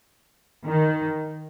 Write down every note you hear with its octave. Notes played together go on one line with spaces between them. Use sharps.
D#3